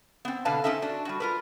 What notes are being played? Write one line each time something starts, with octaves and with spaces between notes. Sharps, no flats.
B3 C4
B2 D3 B4 D5 F5 A5
C4 C#4 D#4 A4 E5
D4 F#4
G3 F#4
F4 A#4 B4